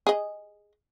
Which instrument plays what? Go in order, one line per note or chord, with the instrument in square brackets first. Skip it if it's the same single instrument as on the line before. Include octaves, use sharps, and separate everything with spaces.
[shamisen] G#4 D#5